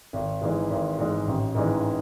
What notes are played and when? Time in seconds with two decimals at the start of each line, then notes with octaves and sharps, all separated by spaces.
0.13 G#1
0.41 G#2 E3 G#3
0.70 G#1
0.98 G#2 E3 G#3
1.27 A1
1.55 G#2 E3 G#3